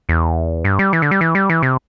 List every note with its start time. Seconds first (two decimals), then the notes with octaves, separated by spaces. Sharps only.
0.09 E2
0.65 G2
0.79 G3
0.93 E3
1.02 D3
1.11 G3
1.21 E3
1.35 G3
1.50 E3
1.63 C3